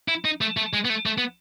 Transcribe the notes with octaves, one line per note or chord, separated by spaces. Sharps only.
E4
D#4
A3
A3
G#3
B3
A3
A3
B3